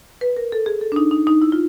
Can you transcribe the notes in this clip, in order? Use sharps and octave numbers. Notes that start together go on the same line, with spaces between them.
B4
A#4
A4
G#4
A4
D4
D#4
D#4
D#4
E4
F4